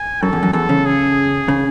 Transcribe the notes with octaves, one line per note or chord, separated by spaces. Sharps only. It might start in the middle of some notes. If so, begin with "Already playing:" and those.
Already playing: G#5
F#2 A4
E2
F#2
E2 A4
C#3
G#4
C#3